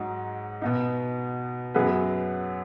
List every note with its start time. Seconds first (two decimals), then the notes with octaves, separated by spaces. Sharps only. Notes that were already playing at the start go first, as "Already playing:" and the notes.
Already playing: G#2 F#3 D#4 F#4
0.62 B2 B3 D#4
1.74 F#2 F#3 B3 G#4 B4